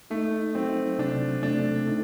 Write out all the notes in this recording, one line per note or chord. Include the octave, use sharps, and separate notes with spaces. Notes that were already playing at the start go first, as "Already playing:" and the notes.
A3 D#4
F#3 C4
C3 D4
A3 D4
D#4